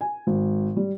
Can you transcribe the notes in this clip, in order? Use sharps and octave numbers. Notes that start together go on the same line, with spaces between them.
G#5
G#1
G3